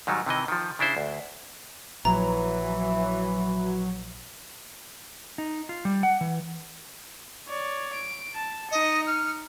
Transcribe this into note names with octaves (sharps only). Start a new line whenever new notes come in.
G#2 D#3 F#3 G3
C3 D#3 E3 D#5
D#3 F3
C#3 D4 E4 C5
D2
A#1 E3 F#3 A#5
D#4
F4
G3
F#5
E3
C#5 D5
D7
A5
D#4 D#5 C#7
F6